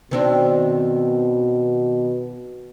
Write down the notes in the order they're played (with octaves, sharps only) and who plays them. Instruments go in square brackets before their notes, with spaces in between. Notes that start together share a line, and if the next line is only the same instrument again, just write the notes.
[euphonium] B2 [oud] D#3 C4 D4